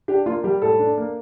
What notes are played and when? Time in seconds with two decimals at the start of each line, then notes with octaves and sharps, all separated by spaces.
0.08 D4 G4
0.26 A#3 F4
0.44 G3 G4
0.61 A2 A4
0.79 D4
0.98 A#3